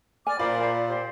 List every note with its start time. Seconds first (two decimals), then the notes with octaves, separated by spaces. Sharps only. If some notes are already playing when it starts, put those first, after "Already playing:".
0.27 D5 G#5 D6 F6
0.39 A#2 F4 A#4 C5 D5 B5
0.88 G4 C5